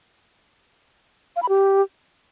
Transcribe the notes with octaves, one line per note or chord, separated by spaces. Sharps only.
F5
B5
G4